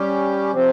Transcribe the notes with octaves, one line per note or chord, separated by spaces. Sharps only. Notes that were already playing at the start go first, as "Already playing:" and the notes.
Already playing: G3 C#4 G4
C3 F3 C4